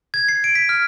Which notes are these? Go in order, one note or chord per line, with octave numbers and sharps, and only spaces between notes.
G#6
C7
D7
B6
F6